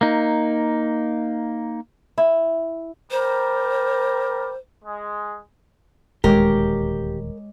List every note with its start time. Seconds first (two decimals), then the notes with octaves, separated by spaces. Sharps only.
0.01 A#3 D#4
2.18 E4
3.11 G3 A#4 C5
4.84 G#3
6.24 D#1 D2 G#3 G4 A#4 C#5 D6